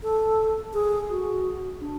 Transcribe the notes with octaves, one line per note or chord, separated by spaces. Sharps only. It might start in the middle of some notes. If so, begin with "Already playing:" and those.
A4
G#4
F#4
D4